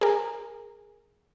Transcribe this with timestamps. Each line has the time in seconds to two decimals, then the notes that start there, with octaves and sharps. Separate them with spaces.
0.01 G#4 A#4